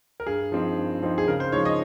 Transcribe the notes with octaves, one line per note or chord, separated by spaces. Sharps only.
A#4
G2 G#4
F3 C4 D#4
G2
F3 C4 D#4
G#4
C#3 A#4
C5
F3 G#3 D#4 C#5
D#5